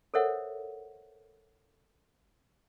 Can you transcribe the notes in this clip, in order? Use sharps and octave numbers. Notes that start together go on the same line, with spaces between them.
A4 A#4 C5 C#5 E5 F#5